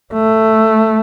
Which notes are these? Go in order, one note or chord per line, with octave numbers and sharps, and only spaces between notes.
A3